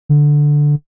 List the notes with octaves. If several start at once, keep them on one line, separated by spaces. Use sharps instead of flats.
D3